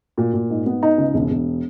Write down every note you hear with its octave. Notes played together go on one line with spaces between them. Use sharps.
A#2
A#2
G#2
B3
D#4
C#2
E1
E1